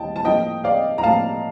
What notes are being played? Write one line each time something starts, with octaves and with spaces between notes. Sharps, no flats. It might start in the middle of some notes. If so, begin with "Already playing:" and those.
Already playing: D#2 D3 G3 D#5 G5 A5
A5
A2 F3 A#3 D#5 G5
D5 F5
A#5
A2 F3 A#3 F5 A5